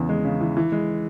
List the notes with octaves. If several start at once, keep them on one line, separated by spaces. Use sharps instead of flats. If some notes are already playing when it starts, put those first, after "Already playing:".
Already playing: E2 C#3 E3
G#3
C#3
E3
E3
G#3